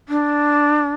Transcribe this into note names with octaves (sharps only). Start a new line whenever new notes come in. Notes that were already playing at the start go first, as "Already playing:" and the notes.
D4